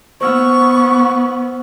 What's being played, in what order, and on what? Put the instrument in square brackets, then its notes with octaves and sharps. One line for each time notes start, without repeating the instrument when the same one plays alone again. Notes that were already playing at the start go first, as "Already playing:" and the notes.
[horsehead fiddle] B3 [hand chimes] C5 E6 F6 [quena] C#6